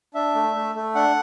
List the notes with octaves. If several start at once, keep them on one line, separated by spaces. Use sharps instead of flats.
D4 E5
A3
A3
A3
D4 F#5